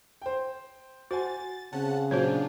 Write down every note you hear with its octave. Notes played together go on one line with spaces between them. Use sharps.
C5 G5
F#4 C5 F#5 G#5 A6
C#3 C4 C#4 F#5 A5
A#2 F#3 D4 F4 F#4 C5 C#5 G6